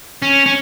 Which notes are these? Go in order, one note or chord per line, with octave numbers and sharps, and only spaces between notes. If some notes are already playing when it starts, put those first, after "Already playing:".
C#4
C#4